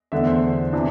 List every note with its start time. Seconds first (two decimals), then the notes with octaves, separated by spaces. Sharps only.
0.12 E2 D3 A3 E5
0.27 C5
0.73 C3 E3 B3 D4